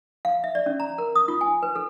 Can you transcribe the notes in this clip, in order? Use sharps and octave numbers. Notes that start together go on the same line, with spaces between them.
F5
E5
D5
C#4
A#5
A#4
D#6
F4
G#5
B4
A4